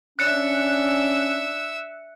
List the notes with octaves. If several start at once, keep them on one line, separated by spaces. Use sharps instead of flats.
C#4 D4 E5 E6 F#6 C#7